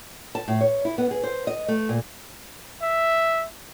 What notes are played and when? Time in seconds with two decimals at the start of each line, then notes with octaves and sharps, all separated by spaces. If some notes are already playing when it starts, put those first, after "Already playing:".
0.35 A5
0.48 A2
0.61 C#5
0.85 E4
0.98 B3
1.11 G#4
1.23 C5
1.47 D#5
1.68 A3
1.89 A#2
2.82 E5